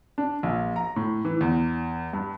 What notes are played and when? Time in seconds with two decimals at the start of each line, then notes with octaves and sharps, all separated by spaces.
0.18 D4
0.43 A#1
0.76 A#5
0.96 A2
1.25 E3
1.41 E2
2.13 G2